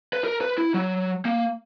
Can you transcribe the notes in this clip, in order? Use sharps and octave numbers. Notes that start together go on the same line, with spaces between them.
B4
A#4
B4
E4
F#3
A#3